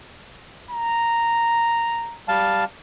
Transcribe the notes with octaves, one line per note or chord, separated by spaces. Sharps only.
A#5
G3 F5 A5